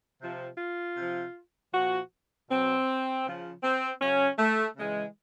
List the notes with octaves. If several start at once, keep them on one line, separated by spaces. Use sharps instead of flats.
C3 F3
F4
C3 F3
A#2 F3 F#4
B2 F#3 C4
C#3 F3
C4
C#3 F#3 C#4
A3
C#3 E3 G#3